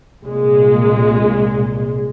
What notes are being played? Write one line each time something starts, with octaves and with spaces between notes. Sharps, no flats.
C2 A#2 G#3